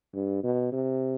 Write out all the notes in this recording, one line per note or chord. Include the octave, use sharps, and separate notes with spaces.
G2
B2
C3